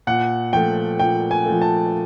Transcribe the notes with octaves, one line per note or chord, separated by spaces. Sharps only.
A#2 F#5
F3 A3 G5
A#2 G5
G#5
F3 A3
A5